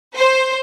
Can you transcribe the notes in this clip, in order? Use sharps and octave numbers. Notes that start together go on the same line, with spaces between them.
C5